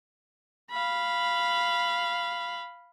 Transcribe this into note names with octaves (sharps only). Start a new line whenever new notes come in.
F5 B5